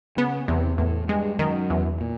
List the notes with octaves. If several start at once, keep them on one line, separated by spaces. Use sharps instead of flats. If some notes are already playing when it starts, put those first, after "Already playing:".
C#3 B3
E2 C3
E2 A2
G2 G#3
F#2 D#3
E2
A#2